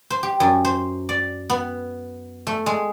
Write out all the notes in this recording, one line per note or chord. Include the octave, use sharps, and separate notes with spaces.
C5
G4
F#2
C5
D5
B3
A3
G#3